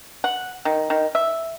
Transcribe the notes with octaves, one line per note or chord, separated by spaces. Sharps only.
F#5
D#3
D#3
E5